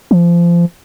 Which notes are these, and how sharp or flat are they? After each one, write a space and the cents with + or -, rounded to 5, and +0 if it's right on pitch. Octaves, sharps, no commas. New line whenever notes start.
F3 -25